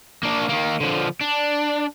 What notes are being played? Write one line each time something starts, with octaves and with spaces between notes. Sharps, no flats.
A#3 D4
D#3 A#3
D3 F3
D4